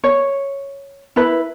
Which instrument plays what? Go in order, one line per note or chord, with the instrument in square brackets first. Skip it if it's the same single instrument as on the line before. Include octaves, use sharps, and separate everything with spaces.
[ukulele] C#5
E4 B4